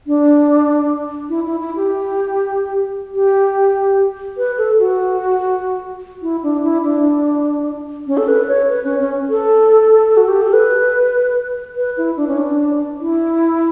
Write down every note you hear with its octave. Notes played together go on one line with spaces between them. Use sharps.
D4
E4
E4
E4
G4
G4
B4
A4
F#4
E4
D4
E4
D4
C#4
A4
B4
C#5
B4
C#4
C#4
A4
F#4
G4
A4
B4
B4
E4
D4
C#4
D4
E4